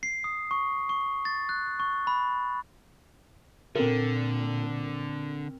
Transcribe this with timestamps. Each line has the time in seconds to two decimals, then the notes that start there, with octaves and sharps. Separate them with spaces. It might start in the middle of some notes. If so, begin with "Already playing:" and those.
0.03 C7
0.24 D#6
0.51 C#6
0.89 C#6
1.25 A6
1.49 F#6
1.80 C#6
2.07 B5
3.75 A#2 D3 C4 A4 A#4